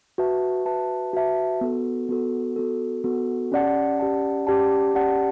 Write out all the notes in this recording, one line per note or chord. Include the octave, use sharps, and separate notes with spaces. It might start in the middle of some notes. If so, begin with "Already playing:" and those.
F#4 B4 E5 A5
F#4 B4 E5 A5
F#4 B4 E5 A5
B3 F#4 A4
B3 F#4 A4
B3 F#4 A4
B3 F#4 A4
C#4 G4 D5 F#5 A5
C#4 G4 D5 F#5 A5
C#4 G4 D5 F#5 A5
C#4 G4 D5 F#5 A5